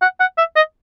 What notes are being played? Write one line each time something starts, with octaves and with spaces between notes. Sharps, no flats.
F#5
F#5
E5
D#5